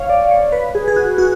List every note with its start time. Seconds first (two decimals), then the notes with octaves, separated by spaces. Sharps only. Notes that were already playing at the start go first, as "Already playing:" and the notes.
Already playing: C#5 F5
0.09 D5
0.31 C#5
0.52 B4
0.75 G#4
0.88 G#4
0.96 F#4
1.18 F#4